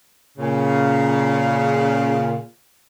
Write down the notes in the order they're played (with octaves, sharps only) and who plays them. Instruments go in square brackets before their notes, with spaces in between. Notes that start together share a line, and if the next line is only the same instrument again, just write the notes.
[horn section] A#2 C#3